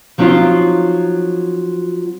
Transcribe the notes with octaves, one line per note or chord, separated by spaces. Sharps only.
F3 F#3 C4 C#4 D#4 F4